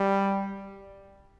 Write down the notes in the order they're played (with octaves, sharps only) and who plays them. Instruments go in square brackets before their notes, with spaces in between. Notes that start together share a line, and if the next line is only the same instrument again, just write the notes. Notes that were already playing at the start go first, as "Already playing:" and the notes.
Already playing: [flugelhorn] G3